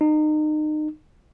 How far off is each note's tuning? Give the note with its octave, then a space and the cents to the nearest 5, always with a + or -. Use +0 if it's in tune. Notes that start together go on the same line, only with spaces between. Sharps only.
D#4 -30